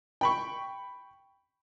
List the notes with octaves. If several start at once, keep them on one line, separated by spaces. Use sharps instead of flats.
G5 B5 C#6